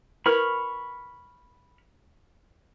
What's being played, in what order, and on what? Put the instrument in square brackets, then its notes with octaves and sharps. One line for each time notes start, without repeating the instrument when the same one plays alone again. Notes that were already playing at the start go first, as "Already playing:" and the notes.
[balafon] E4 A#4 B4 [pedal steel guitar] B5 C#6 F6